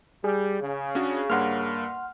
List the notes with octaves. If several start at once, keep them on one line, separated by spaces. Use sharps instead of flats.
G3 G#4
C#3
C#4 D4 F#4
G2 A#3 F#5 C6 F6